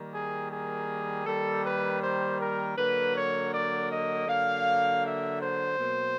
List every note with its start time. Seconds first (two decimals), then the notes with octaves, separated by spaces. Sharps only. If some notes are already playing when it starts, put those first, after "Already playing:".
Already playing: D#3 G3 A#3
0.12 G#4
0.49 G#4
1.25 D#3 G3 A#3 A4
1.63 B4
2.01 C5
2.38 A#4
2.76 D3 F#3 A#3 B4
3.13 C#5
3.52 D5
3.89 D#5
4.27 D3 F#3 A#3 F5
5.03 E5
5.40 C5
5.78 B2 F#3 A#3